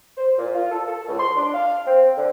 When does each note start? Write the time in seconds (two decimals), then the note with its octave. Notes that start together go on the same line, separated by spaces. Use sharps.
0.17 C5
0.38 A#2
0.54 F4
0.71 A4
0.88 A4
1.08 C#2
1.19 C6
1.36 D4
1.54 F5
1.87 C4
2.17 D3